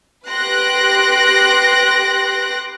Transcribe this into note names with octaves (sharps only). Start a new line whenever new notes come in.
G4 B4 C6 F#6 A#6 D7